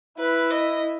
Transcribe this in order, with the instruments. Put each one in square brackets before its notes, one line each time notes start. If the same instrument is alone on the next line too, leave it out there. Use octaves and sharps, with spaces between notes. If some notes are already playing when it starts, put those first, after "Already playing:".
[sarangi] E4 [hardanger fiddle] B4
[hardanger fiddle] D#5